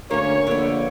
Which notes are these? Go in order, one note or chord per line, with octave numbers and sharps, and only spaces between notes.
D2 A#3 C#4 C#5
A#1 D3 B3